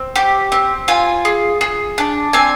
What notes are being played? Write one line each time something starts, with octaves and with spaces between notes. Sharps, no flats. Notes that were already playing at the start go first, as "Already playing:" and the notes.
Already playing: C4
G4
C4
F4 G#5
G#4
G#4
D4
C4 G#5